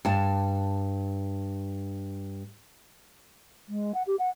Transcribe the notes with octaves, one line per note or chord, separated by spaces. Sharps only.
G2 A5
G#3
F#5
G4
F#5